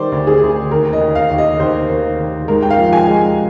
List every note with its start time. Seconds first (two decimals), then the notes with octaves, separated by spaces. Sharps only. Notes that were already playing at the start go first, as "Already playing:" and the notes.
Already playing: D#3 G3 C5 D5
0.12 D2
0.27 G#4
0.42 D2
0.71 D#2 A#4
0.93 D#5
1.01 D#2
1.15 F5
1.31 D#2
1.38 D#5
1.60 D#2 C5
1.89 D#2
2.19 D#2
2.48 G#2 A#4
2.62 G5
2.70 F5
2.78 F3
2.93 G#5
3.07 G#3